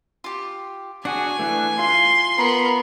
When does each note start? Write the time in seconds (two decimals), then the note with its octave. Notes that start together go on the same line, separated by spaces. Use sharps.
0.24 F4 G4
1.05 D4 F#4 G#4 F#5 G#5
1.39 E3 A3 D4 F#6
1.79 F4 F5 C6
2.38 B3 A#4 A#5 B5